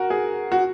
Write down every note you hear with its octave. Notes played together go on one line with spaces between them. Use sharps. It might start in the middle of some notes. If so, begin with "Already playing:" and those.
Already playing: F#4 A#4
G#4
F#4